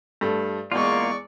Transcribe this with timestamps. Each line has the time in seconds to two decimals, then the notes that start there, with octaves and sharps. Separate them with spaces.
0.21 G2 A3
0.72 E2 G#3 A#3 F4 D5 C#6